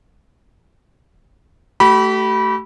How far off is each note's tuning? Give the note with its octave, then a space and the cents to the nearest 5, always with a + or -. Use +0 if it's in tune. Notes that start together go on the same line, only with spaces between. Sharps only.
A3 +0 G4 -45 B5 -15